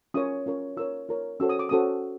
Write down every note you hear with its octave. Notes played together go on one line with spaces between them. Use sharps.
C#4 F4 A#4 C#5 D#6
C#4 F4 A#4 C#5
F4 A#4 C#5 E6
F4 A#4 C#5
C#4 F#4 A4 C5 E6
D#6
D6
C#4 F#4 A4 C5 D#6